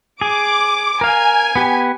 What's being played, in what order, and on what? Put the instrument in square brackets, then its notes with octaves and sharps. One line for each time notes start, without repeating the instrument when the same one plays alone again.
[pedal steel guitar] G#4 [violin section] D6
[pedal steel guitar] A#4 F5 [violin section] G#5
[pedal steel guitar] B3 G4